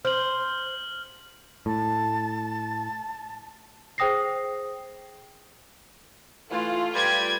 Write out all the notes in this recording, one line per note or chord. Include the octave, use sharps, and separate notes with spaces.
C5 F6 F#7
A2 A5
G#4 C5 G5 D#6 A#6 C7
E3 A3 F4
G3 B4 G5 G#6